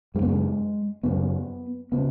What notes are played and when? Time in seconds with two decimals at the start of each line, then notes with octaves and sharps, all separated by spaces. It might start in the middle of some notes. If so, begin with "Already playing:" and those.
0.15 F#2 G#3
0.19 C#3 B3
0.29 G#3
1.03 F#2 C#3 B3
1.92 C#3 B3